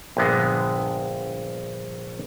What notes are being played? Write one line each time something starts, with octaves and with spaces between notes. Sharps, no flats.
A#1 G2 D3 G#3 B3